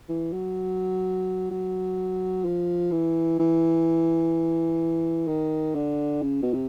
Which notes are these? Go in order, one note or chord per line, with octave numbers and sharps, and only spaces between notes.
E3
F#3
F#3
F3
E3
E3
D#3
D3
C#3
B2
C3